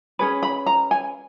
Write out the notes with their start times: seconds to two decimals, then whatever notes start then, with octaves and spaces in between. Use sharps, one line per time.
0.19 C#4 G#4 B4
0.43 B5
0.66 A#5
0.91 G#5